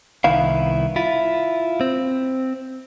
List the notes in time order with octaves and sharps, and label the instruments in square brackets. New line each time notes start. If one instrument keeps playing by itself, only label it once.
[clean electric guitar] C2 D#3 B3 E4 F5
E4 F4
C4